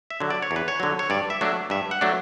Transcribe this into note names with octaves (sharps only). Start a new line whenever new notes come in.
E5
D3 F#3
D5
C#5
E2
B4
C#5
D3 F#3
C#5
G2 D5
E5
F#3 A3 D4
G2 E5
F#5
F#3 A3 D4